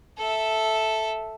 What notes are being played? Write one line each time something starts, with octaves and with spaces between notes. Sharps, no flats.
A4 E5